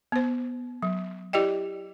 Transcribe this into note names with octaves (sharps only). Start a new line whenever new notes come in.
B3 C5
F#3
E4 G4 D5 D#5 G5